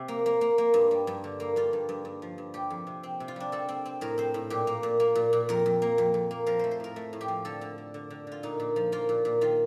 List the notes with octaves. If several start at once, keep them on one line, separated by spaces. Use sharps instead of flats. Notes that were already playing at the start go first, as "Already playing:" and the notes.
Already playing: C3
A#3
A#3
A#3
A#3
G2
G3
G2
D3
A#3
G2 F4
G2
G2
G2
F3
G2
G3 G4
F2
C3
C4
C3
F4
G3 D4
C4 A4
C4
C4
A2 A#4
C4 C5
A2
A#2 G4
A#3
A#2
A#3
A#2
A#2
F2 A#4
F2
A#3
F2
F2
A#3
F3 A#4
A3 C5
C5
A2 A#4
A3
A2
G4
F3
D3 A4
D3
D3
D3
D3
D3 F4
A#2 D#4
A#2
F3
A#3 F4
A#2
A#2
D#3 F4